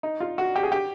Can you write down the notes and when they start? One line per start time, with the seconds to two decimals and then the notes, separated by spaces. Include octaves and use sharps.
0.03 D#4
0.20 F4
0.38 F#4
0.56 G4
0.63 G#4
0.72 G4